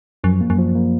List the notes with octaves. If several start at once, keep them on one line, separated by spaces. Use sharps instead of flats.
F#2 F3
A#3
F#2
F3
A#3